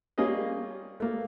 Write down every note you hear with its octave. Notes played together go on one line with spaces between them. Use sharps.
G3 A#3 C#4 F4 G#4 D#5
A3 A#3